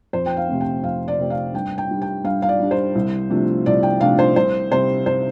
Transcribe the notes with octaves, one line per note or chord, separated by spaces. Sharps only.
F2 C5
G5
F5
C3 A3 C4
G5
F2 F5
D5
C3 A3 C4
F5
G2 G5
G5
G3 D4
G5
G2 F5
F5
D5
G3 D4
C5
C2
C3 F3 A3 D4
C2 D5
G5
C3 F3 A3 D4 F5
C5
C2 C5
C3 G3 C5
C5